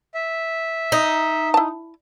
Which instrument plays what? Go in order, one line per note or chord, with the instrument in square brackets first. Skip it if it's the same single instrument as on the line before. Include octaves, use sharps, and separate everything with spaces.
[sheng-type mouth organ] E5
[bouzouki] D#4
[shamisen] E4 A5